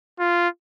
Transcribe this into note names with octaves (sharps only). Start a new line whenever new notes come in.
F4